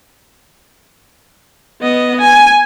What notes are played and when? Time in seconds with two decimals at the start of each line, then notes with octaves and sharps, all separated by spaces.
1.82 B3 D#5
2.21 G#5